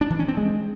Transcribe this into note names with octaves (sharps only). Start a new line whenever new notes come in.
D4
E3
C#4
C4
G#3